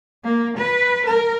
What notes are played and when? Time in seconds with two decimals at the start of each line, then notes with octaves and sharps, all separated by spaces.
0.24 A#3
0.58 B4
1.06 A#4